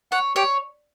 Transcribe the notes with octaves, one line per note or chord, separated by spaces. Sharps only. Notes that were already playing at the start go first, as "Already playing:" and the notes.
C#5 F#5
G4 C#5